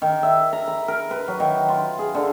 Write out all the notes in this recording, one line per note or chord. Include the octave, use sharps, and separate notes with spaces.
D#3
E5
A#5
B5
A#4
B4
F#3
D#3
F4
G#4
D3